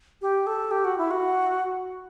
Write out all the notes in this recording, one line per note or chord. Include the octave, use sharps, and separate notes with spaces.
G4
A4
G4
F#4
E4
F#4